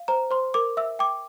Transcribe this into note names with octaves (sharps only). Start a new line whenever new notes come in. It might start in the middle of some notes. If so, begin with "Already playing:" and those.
Already playing: F5
C5 A#5
C5 C6
A#4 D6
E5 E6
G5 D6